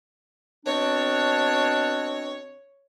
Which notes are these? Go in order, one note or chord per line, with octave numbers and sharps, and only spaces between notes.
B2 C4 D4 C#5